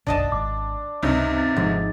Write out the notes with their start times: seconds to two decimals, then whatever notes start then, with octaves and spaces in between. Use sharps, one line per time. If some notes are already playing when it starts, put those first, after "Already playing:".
0.07 F#1 B1 D4 D5 D#5 A5
0.32 G#1 D6
1.03 C#2 G2 C3 C#4 D#4
1.38 A6
1.57 G#1 G#2 F3